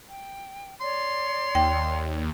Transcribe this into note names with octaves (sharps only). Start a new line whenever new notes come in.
G5
C#5 D5 C6
D#2 G5